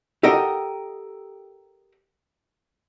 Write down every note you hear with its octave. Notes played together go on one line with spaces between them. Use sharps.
G4 A4 A#4 D#5 F#5 G5